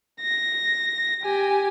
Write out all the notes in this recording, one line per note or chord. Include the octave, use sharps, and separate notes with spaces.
A#6
G4 G#5